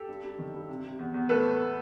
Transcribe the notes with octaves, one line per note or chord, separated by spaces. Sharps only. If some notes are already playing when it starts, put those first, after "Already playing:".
Already playing: G4 A4
G2
G2
D#3
G2
C3
C3
E2
E2
A2 A4 B4
A2
A2